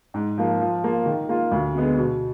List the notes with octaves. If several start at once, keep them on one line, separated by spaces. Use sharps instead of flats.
G#2
F3 A#3
F3
A#3 F4
D#3
A#3 F4
D2
D3 G#3 B3
B2